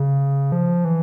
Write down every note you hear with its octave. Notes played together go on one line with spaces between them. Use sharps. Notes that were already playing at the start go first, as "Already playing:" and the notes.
Already playing: C#3
F3
E3